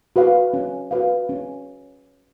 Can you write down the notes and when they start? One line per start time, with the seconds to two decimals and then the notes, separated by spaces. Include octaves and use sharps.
0.16 F#4 B4 F5
0.54 C#4
0.91 F#4 B4 F5
1.29 C#4